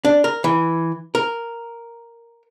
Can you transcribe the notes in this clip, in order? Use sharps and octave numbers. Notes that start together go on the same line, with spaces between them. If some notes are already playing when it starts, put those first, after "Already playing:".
D4
A#4
E3
A#4